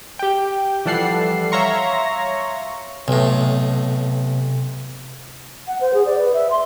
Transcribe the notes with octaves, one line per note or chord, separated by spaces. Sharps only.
G4 G5
E3 F3 G3 A4 F#5 C7
C#5 E5 F5 A#5 C6 C#6
B1 A2 C3
F#5
C5
G#4
D5
B4
E5
C6